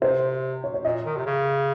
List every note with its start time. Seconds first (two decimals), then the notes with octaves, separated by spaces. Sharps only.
0.02 C3 C5
0.64 C#5
0.74 C#5
0.85 A#2 D#5
1.05 D#3
1.16 C3
1.26 C#3